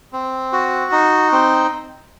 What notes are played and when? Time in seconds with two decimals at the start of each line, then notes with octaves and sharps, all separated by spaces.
0.13 C4
0.53 F#4
0.92 D#4
1.32 C4